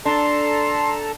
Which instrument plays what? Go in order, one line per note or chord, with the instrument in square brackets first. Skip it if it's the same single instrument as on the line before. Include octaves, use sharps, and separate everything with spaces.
[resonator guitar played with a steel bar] D4 [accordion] A4 A5 A#5 [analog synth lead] C6